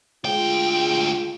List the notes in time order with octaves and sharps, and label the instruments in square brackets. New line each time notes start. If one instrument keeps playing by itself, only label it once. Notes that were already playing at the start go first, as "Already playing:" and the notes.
[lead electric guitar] D2 G5 [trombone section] G#3 F4